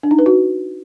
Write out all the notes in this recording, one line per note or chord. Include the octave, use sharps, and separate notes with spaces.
D4
D#4
B4
F#4